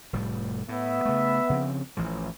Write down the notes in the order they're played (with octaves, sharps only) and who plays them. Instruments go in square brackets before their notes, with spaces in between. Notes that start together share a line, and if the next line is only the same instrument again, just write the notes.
[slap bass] F1 A2 G3
[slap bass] A2 [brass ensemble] B3 E5
[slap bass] C#3 A3
C#3 F3 C4
A1 E3 F3